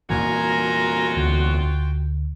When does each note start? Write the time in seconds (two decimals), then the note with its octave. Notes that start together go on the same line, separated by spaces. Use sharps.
0.10 E2 A#2 E3 F4 F#4 A#4 G#5 A#5
1.16 D2 D3 G5